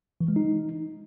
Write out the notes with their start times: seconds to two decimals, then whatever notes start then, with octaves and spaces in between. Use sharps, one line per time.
0.21 E3
0.28 G#3
0.36 D#4